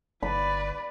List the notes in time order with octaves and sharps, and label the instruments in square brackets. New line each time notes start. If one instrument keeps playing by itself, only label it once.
[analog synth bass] G1 [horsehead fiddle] B4 D5 [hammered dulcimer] B5